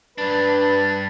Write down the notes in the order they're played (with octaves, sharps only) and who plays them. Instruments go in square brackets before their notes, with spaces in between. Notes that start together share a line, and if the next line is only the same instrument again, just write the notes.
[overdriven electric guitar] G2 D4 [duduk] B4